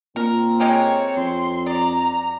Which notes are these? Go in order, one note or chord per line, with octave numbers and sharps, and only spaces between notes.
A#2 C4 A#4
G#3 G4 A#4 C#5
F2 C6
D5 A#5